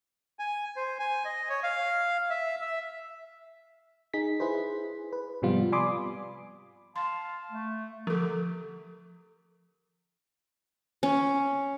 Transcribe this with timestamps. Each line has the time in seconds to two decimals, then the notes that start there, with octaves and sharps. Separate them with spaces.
0.39 G#5
0.76 C5
0.99 G#5
1.25 D#5
1.49 C#5
1.64 F5
2.30 E5
2.61 E5
4.14 D#4 G#4 B6
4.40 E4 G#4 B4 C5
5.13 B4
5.42 G#2 C3 F3 G3 B3 F4
5.72 D5 G#5 B5 C6 D6 D#6
6.96 F5 A5 C6
7.51 A3
8.07 D3 F3 G4 A4 A#4
11.03 C#4